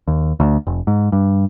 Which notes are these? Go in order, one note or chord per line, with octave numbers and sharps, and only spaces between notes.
D#2
D2
F1
G#2
G2